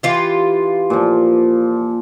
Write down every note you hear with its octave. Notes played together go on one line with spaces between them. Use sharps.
E3 F4 G4
A#2 F3